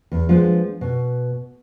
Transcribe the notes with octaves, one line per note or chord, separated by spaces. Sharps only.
E2
F3 G#3 B3 D4
B2